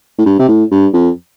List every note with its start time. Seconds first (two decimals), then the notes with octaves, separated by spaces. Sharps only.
0.18 A2
0.25 G2
0.39 C3
0.48 A2
0.71 G2
0.93 F2